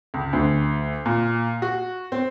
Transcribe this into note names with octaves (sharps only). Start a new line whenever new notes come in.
C#2
D2
A#2
F#4
C4